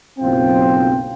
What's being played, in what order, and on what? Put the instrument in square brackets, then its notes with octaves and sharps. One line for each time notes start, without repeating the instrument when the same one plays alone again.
[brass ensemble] F#1 B1 C4 F4 C5 G5